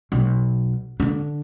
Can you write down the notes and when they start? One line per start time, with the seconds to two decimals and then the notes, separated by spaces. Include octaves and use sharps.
0.12 B1
1.00 D3 D4